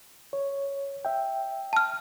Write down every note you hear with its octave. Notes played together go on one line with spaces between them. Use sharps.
C#5
E5 G5
A5 F6